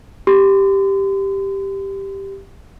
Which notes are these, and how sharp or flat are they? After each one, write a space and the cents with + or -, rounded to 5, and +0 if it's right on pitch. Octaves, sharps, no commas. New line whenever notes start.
G4 +0 C6 -40